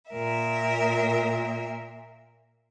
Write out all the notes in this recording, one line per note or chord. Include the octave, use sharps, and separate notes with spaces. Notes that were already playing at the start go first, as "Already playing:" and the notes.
A#2 A#4 E5